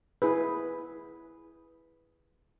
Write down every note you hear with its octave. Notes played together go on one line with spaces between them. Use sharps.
E4 G#4 B4